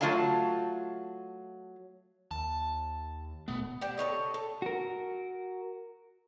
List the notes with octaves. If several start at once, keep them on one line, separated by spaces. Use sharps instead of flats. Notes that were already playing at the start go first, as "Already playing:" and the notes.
F#3 A3 F4 C#5 F5 A5
D#2 A5
D#1 B2 A3 B3
D4 G4
A4 A#4 C#5 D#5
A4
F#4 A#4